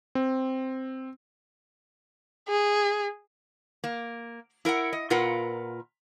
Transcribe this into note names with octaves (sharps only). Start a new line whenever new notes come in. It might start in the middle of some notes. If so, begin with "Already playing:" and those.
C4
G#4
A#3
E4 A#4 F5 F#5
D#5
A#2 F4 A#4 B4 F#5